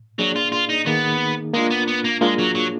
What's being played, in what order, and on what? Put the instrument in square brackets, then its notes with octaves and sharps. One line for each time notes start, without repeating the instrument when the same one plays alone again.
[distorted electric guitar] F#3 [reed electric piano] A#3 D4 G#4 D5
[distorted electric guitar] F4
F4
D#4
[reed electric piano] D#3 A#3 D#4 G#4 [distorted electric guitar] B3
[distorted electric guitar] G#3 [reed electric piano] A#3 D4 F4
[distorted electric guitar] B3
B3
A#3
[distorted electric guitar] G#3 [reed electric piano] A#3 D4 F4 G#4
[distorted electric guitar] F#3
F#3